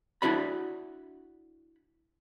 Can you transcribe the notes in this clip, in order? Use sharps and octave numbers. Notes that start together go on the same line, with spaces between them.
D4 E4 F#4 D5 B5